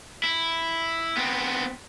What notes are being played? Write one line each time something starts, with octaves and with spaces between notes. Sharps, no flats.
E4
B3 C4